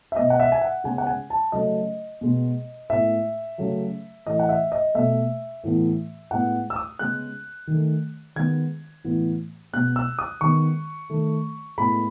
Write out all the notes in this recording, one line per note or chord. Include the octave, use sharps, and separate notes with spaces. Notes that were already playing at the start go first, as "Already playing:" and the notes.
E5
B2 G#3 B3 D#5
F#5
E5
G#5
F#5
C#3 G#3 B3 G#5
F#5
G#5
A5
C#3 F#3 A3 D#5
B2 G#3 B3
A2 G#3 B3 E5
C#3 F#3 A3
A2 E3 A3 D#5
F#5
E5
D#5
B2 A3 E5
A2 E3 B3
A2 G#3 B3 F#5
E6
D#6
C#3 G#3 B3 F#6
D#3
A3
D#3 G#3 B3 G#6
A2 E3 B3
B2 G#3 B3 F#6
E6
D#6
D#3 G#3 B3 C#6
D#3 A3
A2 G#3 B3 B5